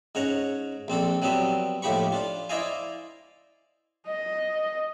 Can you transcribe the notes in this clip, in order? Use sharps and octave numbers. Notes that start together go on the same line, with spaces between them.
G#2 C#4 F#5 A#5
A#1 C4 D4 A4
F#3 G3 B3 C4 E5
D#2 A2 F3 G4 B5 C#6
D4 F4
E4 C5 D5 D#5 F5 G#5
D#5